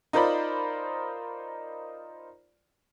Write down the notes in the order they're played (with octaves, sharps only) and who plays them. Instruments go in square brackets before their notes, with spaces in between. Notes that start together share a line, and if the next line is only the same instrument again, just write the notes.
[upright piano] D#4 F4 A#4 C5 D5 B5